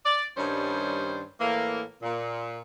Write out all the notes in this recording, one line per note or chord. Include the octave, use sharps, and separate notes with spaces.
D5
G2 D#3 G3 C#4 C5
A2 E3 A#3
A#2